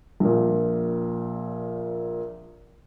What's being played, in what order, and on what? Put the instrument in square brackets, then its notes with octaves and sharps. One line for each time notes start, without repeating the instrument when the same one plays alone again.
[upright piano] A#1 A#2